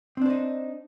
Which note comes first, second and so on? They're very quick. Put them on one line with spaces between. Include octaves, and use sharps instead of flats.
C4 D4 C5 D#4